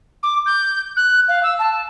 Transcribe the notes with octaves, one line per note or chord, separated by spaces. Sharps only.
D6
G6
F#6
F5
E6
A5